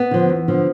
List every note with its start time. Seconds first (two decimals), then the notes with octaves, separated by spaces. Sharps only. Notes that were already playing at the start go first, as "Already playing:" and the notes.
Already playing: B3
0.11 D3 F3
0.29 E2
0.48 D3 F3